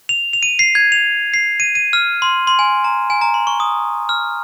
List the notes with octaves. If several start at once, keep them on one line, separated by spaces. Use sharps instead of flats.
F7
F7
D#7
C7
G#6
F7
C7
D#7
D#7
F6
C6
C6
G#5
A#5
G#5
A#5
C6
C#6
D#6
F6